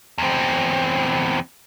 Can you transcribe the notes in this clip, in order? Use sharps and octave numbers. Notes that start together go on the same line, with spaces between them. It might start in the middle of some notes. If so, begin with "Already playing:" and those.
E2 C4